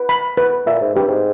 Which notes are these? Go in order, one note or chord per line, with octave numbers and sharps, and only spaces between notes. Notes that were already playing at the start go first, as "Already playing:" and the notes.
Already playing: B4
B5
B4
A#2 E5
G#2
G2 G4
G#2